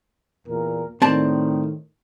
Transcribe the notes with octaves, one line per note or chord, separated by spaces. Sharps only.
E2 A#2 A#4
A2 D#3 C4 D5 A5